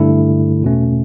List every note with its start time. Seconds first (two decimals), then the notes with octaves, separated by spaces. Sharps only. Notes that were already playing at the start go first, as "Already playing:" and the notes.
Already playing: G2 D3 A3 E4
0.63 E2 B2 A3 C#4